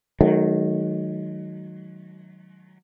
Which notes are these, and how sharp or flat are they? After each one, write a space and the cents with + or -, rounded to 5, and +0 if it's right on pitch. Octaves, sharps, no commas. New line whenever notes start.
D#3 +0 F#3 +0 A3 -45